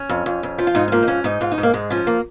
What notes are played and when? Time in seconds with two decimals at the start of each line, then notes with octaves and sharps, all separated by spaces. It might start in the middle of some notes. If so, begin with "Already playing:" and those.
Already playing: C#4
0.09 F2
0.26 F2
0.43 F2
0.58 F3
0.67 F4
0.75 G#2 D#4
0.88 C#4
0.92 F3 A#3
1.03 D#4
1.08 G#2 C#4
1.24 G#2 D#4
1.41 G#2 F4
1.52 D#4
1.58 G#2
1.63 A#3
1.73 G#2 G#3
1.90 F3 C#4
2.07 A#3